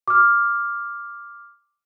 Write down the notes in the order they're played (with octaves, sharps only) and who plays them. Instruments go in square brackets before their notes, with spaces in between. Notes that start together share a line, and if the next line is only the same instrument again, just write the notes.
[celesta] D6 F6